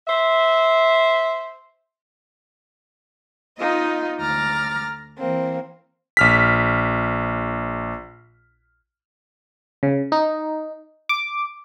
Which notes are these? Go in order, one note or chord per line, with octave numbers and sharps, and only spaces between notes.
C5 E5
B3 D#4 F4 D#5
D2 A#5 D6 F6 A6
E3 A#3 C4
A#1 F6 B6
C#3
D#4
D6